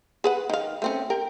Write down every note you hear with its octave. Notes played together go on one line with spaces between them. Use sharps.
G#4 B4 F#5
D#3 F5
A3 C4 C#4
G4 A#4 G5